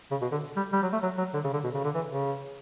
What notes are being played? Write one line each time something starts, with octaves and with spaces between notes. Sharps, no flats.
C#3
B2
D3
G3
G3
F#3
A3
F#3
F#3
D3
C#3
D3
B2
C#3
D3
E3
C#3